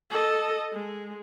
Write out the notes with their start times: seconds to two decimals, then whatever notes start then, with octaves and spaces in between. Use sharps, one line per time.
0.10 A4 D#5
0.74 G#3